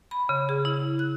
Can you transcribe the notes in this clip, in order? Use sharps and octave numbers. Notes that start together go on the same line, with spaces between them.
B5
C#3
G#4
E4
F#6